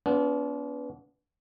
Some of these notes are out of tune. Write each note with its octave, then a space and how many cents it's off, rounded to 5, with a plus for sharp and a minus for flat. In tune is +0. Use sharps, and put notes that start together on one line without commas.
B3 +0 D4 -40 F4 +0